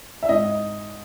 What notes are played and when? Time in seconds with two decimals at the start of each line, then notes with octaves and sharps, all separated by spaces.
0.23 E5
0.29 G#2 D#5